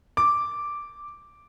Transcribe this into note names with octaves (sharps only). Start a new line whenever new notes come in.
D6